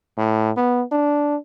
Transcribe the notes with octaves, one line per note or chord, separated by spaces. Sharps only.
A2
B3
D4